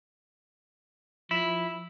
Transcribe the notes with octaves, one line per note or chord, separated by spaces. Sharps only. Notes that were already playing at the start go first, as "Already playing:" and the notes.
F3 E4